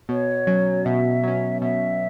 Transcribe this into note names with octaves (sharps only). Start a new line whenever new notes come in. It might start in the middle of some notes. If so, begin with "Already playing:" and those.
B2 C#5
F#3 C#4
B2 E5
F#3 C#4
B2 E5